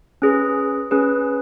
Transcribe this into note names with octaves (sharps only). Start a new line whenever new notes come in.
C#4 G#4 B4
C#4 G#4 B4